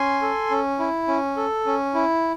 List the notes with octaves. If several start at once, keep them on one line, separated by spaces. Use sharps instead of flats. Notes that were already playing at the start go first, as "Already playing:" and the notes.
Already playing: C#4 G#5 C6
A4
C#4
E4
C#4
A4
C#4
E4